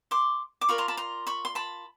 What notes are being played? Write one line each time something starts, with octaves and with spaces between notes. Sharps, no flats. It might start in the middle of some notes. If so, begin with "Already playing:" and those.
C6 D6
D6
F4 A#4 D5 B5 C#6
A#5 C6
A5 B5
A#5 C6
B5 C#6
C6
A5 B5